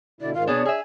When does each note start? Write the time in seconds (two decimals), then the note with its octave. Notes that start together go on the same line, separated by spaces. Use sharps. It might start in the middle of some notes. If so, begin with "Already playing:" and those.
0.21 B2 D3 E4 D5
0.34 G#2 D#3 F4 F5
0.47 B2 B3 D4 G#4 C#5
0.65 G#4 E5 G#5